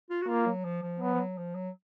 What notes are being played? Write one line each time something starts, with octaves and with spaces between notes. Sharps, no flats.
F4
F#4
A#3 F4
F#3
F3
F3
F#3 B3
F3
F#3
F3
F#3